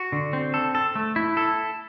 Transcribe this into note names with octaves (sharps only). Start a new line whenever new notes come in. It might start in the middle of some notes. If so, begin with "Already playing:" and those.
Already playing: F#4
D3
C4
A4
A4
A3
E4
A4